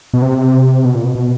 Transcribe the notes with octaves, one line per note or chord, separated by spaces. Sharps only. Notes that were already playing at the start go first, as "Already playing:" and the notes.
B2
C3
B2
A#2
B2
B2